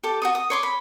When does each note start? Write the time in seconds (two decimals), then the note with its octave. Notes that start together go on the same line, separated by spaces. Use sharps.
0.03 G4 A4
0.22 F#4 A4 D#6
0.35 D#6
0.50 C#5 C6 D6
0.63 B5